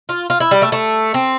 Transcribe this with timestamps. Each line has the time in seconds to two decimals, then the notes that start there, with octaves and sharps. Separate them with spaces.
0.09 F4
0.30 F4
0.40 E4
0.51 G3
0.62 A3
0.72 A3
1.14 C4